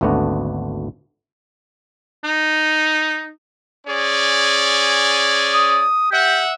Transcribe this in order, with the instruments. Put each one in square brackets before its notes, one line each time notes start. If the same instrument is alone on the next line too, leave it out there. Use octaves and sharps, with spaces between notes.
[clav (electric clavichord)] G#1 D2 A3 B3 D4 F#4
[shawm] D#4
[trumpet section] C#4 G#4 D5
[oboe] D#6
[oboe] G4 [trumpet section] E5 F#5